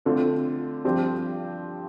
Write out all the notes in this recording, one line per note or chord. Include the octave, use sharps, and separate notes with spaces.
F2 D3 A3 C4 F4
G2 F3 C4 G4 C5